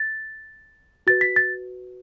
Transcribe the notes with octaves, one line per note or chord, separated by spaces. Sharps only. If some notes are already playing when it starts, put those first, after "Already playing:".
Already playing: A6
F#4 B4 A6
B6
A6